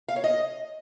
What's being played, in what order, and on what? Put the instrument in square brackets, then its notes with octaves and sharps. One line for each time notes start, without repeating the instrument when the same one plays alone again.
[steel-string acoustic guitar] F5
C#5
D#5